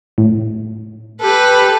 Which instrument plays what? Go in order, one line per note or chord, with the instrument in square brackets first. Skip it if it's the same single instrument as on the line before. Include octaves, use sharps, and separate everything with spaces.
[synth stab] A2
[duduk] G4 [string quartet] A4 [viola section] B4